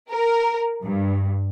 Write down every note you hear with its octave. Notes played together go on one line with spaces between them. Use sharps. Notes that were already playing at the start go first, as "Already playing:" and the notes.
A#4
G2